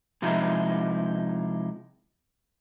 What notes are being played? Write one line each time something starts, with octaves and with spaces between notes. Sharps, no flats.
C3 F3 G#3 D#4 E4